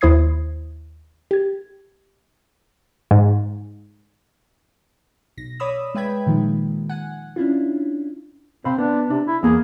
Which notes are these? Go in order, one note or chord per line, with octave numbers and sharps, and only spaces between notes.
D#2 E4 C5 D#6 G#6 C7
G4 G#6
G#2
B1 A#6
C#5 D5 B5 D#6 E6
G#3 B4 E5 G5 B5 G#6
A#2 D#3 F3 G#3
F#5 G#5
C#4 D4 E4 F4
C3 C4 F5 B5
B3 D4
C3 D4
E4
E2 A#3 G#4